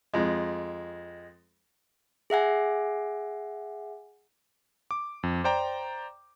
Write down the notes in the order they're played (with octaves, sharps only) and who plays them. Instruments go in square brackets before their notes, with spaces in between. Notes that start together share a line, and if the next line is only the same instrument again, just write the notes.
[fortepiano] F2 G#3
[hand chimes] G#4 E5 F#5 G#5
[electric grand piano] D6
F2
C5 D5 G5 A#5